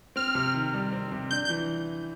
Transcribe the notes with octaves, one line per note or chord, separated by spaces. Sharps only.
C4 F6
C3
D#3
G3
C4
C3
D4 G6
G6
E3